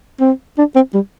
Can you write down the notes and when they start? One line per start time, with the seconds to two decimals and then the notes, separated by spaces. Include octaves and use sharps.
0.20 C4
0.58 D4
0.76 C4
0.94 G3